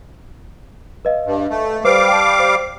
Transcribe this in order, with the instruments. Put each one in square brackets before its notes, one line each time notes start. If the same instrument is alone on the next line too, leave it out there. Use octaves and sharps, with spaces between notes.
[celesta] B4 D#5 F5
[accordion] G2
A3
[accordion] G3 F5 D6 [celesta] B4 C5
[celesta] G5 A5
C5